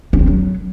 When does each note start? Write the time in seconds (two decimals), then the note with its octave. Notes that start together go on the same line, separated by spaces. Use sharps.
0.13 C#4
0.20 C4
0.27 F#3